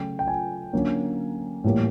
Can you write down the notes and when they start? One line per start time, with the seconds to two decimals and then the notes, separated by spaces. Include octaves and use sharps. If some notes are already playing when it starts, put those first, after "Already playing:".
Already playing: C#3 F#3 A3 G5
0.19 G5
0.28 G#5
0.73 D3 F#3 A#3 C#4
1.64 A2 E3 G3 A#3